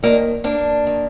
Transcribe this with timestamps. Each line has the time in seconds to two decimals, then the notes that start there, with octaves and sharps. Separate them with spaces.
0.03 D#2 D#3 A#3 D4
0.44 A#3 D4
0.87 D#3